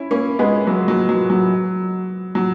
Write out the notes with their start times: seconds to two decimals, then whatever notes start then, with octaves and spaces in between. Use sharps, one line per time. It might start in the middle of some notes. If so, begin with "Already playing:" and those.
Already playing: C#4 E4
0.11 A#3 C#4
0.39 G#3 B3
0.67 F#3 A#3
0.88 F#3
1.09 F#3
1.30 F#3
2.35 F#3